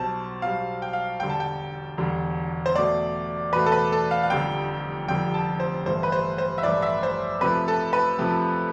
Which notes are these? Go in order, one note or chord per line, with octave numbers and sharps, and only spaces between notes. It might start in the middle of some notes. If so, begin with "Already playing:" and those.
Already playing: B1 B2 G3 C5 A5
B1 B2 G3 F5
G5
F5
E1 E2 D3 G3 G5
A5
G5
E1 E2 D3 G3
C5
E2 B2 A3 D5
E2 B2 A3 B4
A4
B4
A4
F5
F5
F1 F2 D3 G3 G5
F1 F2 D3 G3 G5
A5
C5
A1 G2 E3 A3 C5
B4
C5
C5
E5
A1 G2 E3 A3 D5
E5
C5
F2 C3 F3 A3 B4
A4
B4
F2 C3 F3 A3